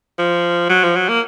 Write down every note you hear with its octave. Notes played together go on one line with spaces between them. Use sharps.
F3
F#3
F3
F#3
A#3